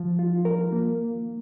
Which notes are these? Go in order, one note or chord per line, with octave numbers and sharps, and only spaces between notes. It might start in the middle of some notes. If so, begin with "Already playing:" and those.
Already playing: F3
F4
A#4
A#3